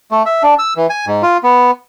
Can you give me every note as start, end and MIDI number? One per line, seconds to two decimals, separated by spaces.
0.12 0.23 57
0.26 0.43 76
0.43 0.54 62
0.59 0.74 88
0.77 0.87 52
0.90 1.05 80
1.07 1.22 44
1.23 1.37 65
1.44 1.71 59